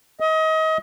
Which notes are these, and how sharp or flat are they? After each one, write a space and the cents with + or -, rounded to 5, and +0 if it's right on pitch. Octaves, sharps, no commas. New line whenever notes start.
D#5 +30